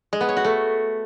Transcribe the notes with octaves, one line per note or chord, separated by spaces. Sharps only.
G#3
B3
C#5
F#4
A3